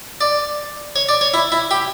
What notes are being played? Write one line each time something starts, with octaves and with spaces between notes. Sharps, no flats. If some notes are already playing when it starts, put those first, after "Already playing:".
D5
C#5
D5
C#5
E4
E4
G4